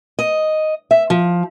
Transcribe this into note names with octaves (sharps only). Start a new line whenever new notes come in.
D#5
E5
F3